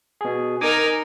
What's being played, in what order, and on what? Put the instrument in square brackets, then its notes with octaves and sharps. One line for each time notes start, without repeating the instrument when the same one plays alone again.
[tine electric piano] B2 G#4
[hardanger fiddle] D#4 A#4 [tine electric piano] G#5 D6 D#6